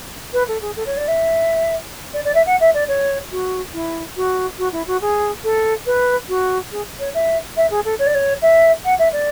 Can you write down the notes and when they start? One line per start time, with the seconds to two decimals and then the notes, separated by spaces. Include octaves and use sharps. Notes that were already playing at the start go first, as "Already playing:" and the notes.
0.33 B4
0.47 A4
0.61 G#4
0.76 A4
0.86 C#5
0.97 D5
1.07 E5
2.13 D5
2.24 D5
2.34 E5
2.45 F#5
2.60 E5
2.74 D5
2.88 C#5
3.31 F#4
3.73 E4
4.16 F#4
4.58 F#4
4.72 E4
4.87 F#4
5.01 G#4
5.43 A4
5.86 B4
6.28 F#4
6.71 G#4
6.99 C#5
7.14 E5
7.56 E5
7.70 G#4
7.84 A4
7.98 C#5
8.06 D5
8.14 C#5
8.41 E5
8.84 F#5
8.98 E5
9.12 D5